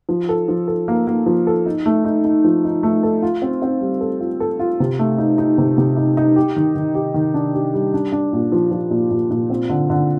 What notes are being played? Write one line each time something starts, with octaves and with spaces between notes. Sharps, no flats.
F3
A4
F3
A4
A#3
A#3
F3
A4
D#4
A3
D#4
D#4
F3
D#4
A3
A4
F4
C4
C4
G3
A4
F4
A4
F4
C3
A3
D#4
D#4
C3
C3
D#4
D#4
G4
D#3
D#3
G4
D#3
D4
G4
G3
D4
D4
A#2
F3
F3
A#2
A#2
A#2
C4
D3
D3